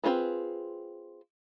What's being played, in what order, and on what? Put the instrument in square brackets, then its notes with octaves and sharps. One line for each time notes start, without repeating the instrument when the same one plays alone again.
[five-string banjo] C4 D#4 F4 G#4 B4